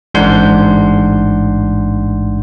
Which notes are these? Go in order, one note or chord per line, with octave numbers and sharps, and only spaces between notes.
A1 G#2 D4 F#5 C6 G6